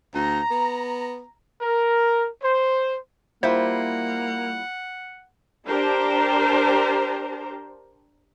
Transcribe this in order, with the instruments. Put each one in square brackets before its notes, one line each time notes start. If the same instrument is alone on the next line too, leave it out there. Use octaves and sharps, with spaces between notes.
[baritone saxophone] D2 [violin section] A#5
[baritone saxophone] B3
[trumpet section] A#4
C5
[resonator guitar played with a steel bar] G3 E4 F4 [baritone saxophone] A#3 [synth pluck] C5 [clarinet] F#5
[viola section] D4 G4 A#4 C5 A5 A#5